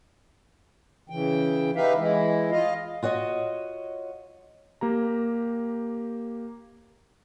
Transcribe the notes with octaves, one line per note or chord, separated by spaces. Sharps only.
C#3 E3 G5
D#4 G4 B4 E5 F5
E3 G#3 E4
F4 D#5 F5
F4 F#4 C#5 D#5
A#3 G4 A#5